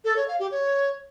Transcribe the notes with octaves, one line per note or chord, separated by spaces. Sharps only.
A4
C#5
F5
G4
C#5